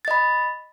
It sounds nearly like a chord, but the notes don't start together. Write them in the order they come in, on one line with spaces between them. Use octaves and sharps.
A6 D#5 B5